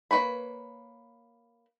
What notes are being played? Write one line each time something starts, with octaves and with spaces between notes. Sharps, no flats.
A#3 E4 B4 C#5 B5